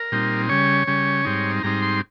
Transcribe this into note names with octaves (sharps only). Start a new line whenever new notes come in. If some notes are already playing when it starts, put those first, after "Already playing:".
Already playing: A#4
A#2 G3 C4 D#4
C#3 G3 C#4 C#5
C#3 G3 C#4
G#2 G3 C4 D#4
G#2 G3 C4 D#4 A#5
C6